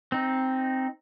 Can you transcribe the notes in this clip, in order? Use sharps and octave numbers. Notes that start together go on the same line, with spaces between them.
C4 D#4